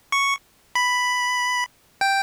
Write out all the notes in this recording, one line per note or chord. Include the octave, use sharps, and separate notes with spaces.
C#6
B5
G5